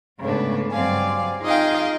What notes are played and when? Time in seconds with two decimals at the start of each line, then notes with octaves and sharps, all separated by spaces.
0.20 G#2 C#3 A3 B3 D4
0.71 G2 F#3 C4 D5 F5 G#5
1.42 D#4 F4 G#4 D#5 F5 G5